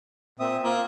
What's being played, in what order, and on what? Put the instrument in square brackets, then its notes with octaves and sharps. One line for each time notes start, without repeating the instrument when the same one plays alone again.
[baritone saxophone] A#2 [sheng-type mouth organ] C4 E5 D#6
[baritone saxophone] A#3 [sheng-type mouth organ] F4